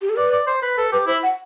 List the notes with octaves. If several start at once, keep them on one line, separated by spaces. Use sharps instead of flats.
G4
A4
B4 D5
D5
C5
B4
A4 B4
G4 B4
E4 C5
F#5